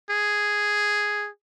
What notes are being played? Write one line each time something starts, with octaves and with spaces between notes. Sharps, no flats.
G#4